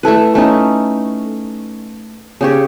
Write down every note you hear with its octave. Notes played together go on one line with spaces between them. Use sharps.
A3 E4 A4 B4
A3 C#4 D#4
C#3 G4 C#5